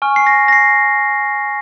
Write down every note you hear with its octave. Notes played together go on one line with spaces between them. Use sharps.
G#5 C#6 F6
C7
A#6
A#6
C7